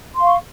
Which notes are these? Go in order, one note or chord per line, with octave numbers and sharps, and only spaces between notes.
F5 C6 C#6